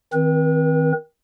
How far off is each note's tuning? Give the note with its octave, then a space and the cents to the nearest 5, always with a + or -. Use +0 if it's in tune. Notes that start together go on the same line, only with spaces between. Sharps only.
D#3 +20 C4 +0 B4 -40